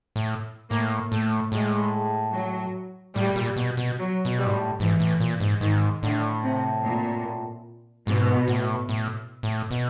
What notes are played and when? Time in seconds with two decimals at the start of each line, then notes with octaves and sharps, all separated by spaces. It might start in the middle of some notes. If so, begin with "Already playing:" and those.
0.16 A2
0.71 A2 A#3
1.12 A2 A3
1.52 A2 G#3
2.34 F#3
3.16 A2 G3
3.36 A#2
3.56 B2
3.77 B2
3.98 F#3
4.25 B2
4.39 G3
4.46 G#2
4.53 A2
4.79 G#2 E3
5.00 A2
5.20 A#2
5.40 G#2
5.61 G#2 D#3
6.03 A2 D3
6.43 C3
6.84 A#2
8.06 G#2 B2
8.48 A2
8.89 A2
9.43 A2
9.71 B2